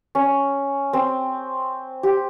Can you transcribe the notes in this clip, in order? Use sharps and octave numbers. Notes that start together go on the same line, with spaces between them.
C#4
C4
G4